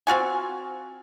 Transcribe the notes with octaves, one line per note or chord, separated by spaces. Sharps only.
C4 F4 F#4 G#5